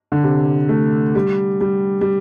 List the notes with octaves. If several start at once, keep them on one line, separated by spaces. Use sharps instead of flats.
D3
C3
A3
G3
G3
G3